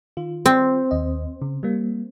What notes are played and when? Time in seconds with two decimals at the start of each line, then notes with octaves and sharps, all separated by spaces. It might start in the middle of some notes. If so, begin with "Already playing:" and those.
0.17 D#3 F4
0.46 C4
0.91 D#2 D#5
1.42 C#3
1.63 G3 A#3